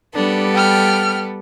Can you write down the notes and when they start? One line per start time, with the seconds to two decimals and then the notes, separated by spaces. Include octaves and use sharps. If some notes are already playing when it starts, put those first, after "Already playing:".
0.15 G3 B3 D4 A4
0.54 G5 F6